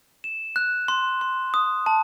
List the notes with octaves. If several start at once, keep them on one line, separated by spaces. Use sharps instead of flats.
E7
F#6
C6
C6
D#6
A5